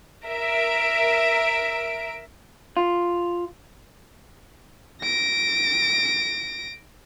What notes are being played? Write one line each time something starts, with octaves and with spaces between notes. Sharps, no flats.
A#4 E5 D7
F4
A#6 D7